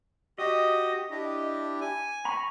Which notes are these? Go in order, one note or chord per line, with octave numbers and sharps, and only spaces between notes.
F#4 G4 D#5 D#6
D4 E4 G4
G#5
A#5 B5 C#6